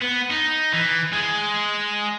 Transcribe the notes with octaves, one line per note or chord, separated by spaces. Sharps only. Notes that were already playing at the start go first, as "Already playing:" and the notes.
B3
D#4
E3
G#3